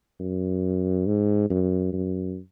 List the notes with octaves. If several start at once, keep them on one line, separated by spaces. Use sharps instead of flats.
F#2
G#2
F#2
F#2